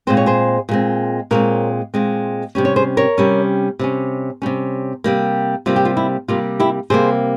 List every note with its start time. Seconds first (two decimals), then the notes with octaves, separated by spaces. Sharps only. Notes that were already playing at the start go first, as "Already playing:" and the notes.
0.07 A#2 G#3 C4 C5
0.17 C#5
0.26 G#4 C5
0.69 A#2 G#3 C4
1.31 A#2 G#3 C4 A#4 C#5
1.94 A#2 G#3 C4
2.55 C3 G3 C#4
2.65 C#5
2.76 G#4 C5
2.97 A#4 C#5
3.18 C3 G3 C#4
3.79 C3 G3 C#4
4.42 C3 G3 C#4
5.04 C3 G3 A#3
5.66 C3 G3 A#3 F4
5.76 G4
5.85 F4
5.97 E4
6.28 C3 G3 A#3 F4
6.59 E4 G4
6.90 C3 G3 A#3 G#4 C5